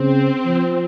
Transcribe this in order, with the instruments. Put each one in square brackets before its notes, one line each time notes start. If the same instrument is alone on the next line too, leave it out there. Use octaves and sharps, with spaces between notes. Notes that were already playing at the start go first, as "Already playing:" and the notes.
Already playing: [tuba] C#3 [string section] C4
[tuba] F3